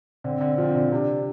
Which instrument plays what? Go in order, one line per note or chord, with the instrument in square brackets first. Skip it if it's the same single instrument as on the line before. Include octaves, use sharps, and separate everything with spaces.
[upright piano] D3 [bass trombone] C4
[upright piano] D3
[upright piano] F3 [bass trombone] C4
[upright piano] D3
[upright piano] C3 [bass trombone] D4